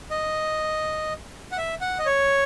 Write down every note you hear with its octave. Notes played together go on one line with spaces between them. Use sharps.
D#5
F#5
E5
F#5
D#5
C#5